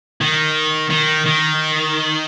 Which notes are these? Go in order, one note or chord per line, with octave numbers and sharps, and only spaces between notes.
D#3
D#3
D#3